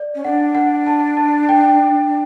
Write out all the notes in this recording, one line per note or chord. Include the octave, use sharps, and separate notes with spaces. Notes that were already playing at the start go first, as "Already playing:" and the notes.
Already playing: D5
C#4
D4 F#5
F#5
A5
A5
G5